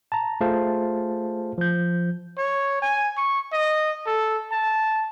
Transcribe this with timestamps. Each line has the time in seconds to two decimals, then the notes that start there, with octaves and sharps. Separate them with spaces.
0.12 A5 A#5
0.41 A3 F4 G#4 C5 F5 A5
1.58 F3 G6
2.38 C#5
2.82 G#5
3.17 C#6
3.52 D#5
4.06 A4
4.52 A5